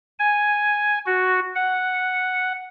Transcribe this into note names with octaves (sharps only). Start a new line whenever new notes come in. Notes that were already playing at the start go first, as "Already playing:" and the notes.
G#5
F#4
F#5